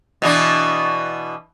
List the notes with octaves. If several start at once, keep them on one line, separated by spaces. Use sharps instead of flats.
B2 E3 D4